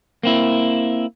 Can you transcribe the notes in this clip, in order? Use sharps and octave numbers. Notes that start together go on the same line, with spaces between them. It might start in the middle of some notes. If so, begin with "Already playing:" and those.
A#3 C4 E4